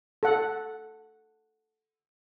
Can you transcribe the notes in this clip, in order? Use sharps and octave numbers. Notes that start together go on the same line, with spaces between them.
A4 F#5